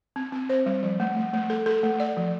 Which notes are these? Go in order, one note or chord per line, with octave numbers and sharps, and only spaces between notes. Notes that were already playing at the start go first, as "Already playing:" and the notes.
C4
C4
C5
G3
F3
A3
A3
A3
A4
A4
A3
D5
F3